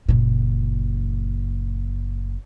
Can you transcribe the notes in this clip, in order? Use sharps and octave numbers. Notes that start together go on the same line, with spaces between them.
F#1 A#2